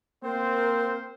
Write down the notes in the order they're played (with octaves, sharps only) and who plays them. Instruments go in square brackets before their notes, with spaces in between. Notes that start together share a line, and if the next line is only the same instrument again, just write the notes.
[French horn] A#3 [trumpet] C4 [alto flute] A#4 [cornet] C5